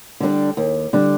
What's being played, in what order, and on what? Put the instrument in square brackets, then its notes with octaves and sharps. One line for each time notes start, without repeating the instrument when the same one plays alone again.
[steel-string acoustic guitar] D3 G3 D4
D#2
D3 G3 D4